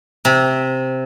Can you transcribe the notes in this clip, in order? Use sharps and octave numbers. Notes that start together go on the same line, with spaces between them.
C3